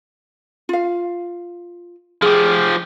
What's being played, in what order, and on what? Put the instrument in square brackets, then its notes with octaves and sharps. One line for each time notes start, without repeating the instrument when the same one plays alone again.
[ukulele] F4 F5
[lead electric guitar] F3 G4 [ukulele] G#4